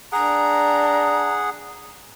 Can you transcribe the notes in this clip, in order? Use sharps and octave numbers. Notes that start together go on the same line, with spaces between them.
D4 G#4 F#5 A#5